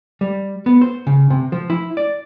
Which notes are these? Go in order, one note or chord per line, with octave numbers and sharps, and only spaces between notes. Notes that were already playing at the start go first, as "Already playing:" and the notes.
G3
B3
C5
C#3
C3
F3
E4
D5